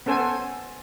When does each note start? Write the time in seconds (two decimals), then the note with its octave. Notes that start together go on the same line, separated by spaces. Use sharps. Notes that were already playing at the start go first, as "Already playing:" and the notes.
0.06 B3 C#4 A4 C5 G#5